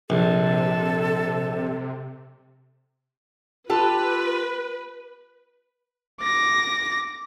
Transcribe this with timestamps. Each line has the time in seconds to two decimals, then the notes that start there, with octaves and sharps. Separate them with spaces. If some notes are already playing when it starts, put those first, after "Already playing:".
0.10 A#1 C3 A4
3.70 F4 G4 A4 B4
6.20 D6 A#6